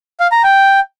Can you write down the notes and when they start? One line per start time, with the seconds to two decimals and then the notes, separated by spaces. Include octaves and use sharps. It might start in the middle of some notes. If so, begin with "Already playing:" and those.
0.20 F5
0.32 A#5
0.44 G5